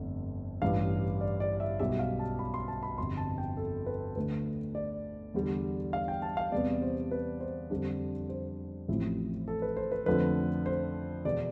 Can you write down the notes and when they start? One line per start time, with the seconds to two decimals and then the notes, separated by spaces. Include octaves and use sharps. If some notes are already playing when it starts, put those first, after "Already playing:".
Already playing: G1 F2 D3 A3
0.62 A1 G2 E3 F5
1.21 D5
1.40 D5
1.60 E5
1.79 B1 B2 G3 E5
1.99 F5
2.19 A5
2.39 B5
2.54 C6
2.68 A5
2.83 B5
2.98 G1 F2 C3 C6
3.17 A5
3.38 G5
3.57 A4
3.86 B4
4.15 D2 D3 A3 B4
4.75 D5
5.34 E2 D3 G3
5.93 F5
6.08 G5
6.22 A5
6.37 F5
6.52 E2 C3 G3 B3 D5
6.82 C5
7.11 B4
7.40 C5
7.70 F2 D3 G3 D4
8.29 C5
8.88 A1 A2 F3 C4 E4
9.48 A4
9.62 B4
9.77 C5
9.92 B4
10.06 F2 D3 F3 A3 B4
10.66 C5
11.25 E1 E2 B2 B3 D5